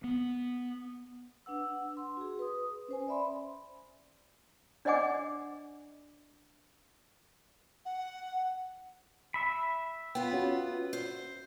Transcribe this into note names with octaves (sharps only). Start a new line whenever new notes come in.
B3
D4 B4 F#5 E6
C6
F#4 G#4
B4 D#6
C#4 C5 G#5
D5 E5 B5 C6
D4 D5 D#5 F#5 G#5 D6
F#5
E5 B5
B3 F4 G5
C#4 F#4
C5